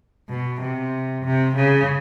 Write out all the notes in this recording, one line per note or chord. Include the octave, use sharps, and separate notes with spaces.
B2
C3
C3
C#3